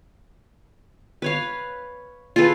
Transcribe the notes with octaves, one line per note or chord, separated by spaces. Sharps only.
B4 C#5 F5
F4 G#4 A4 B4